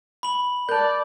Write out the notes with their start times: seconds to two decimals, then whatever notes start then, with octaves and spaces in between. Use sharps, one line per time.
0.23 B5 F#7
0.69 A#4 D5 A5 G6